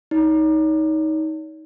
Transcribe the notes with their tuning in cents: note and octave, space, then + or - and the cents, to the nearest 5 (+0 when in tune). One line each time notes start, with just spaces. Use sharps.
D#4 +15 C#5 +40